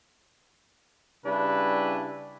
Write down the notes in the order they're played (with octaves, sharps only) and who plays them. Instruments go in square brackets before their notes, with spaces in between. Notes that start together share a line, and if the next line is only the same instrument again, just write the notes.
[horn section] C#3 G3 D4 E4 B4